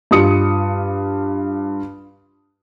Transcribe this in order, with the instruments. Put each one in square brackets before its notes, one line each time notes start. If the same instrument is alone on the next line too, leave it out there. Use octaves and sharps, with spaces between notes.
[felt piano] G2 F4 D#6 C#7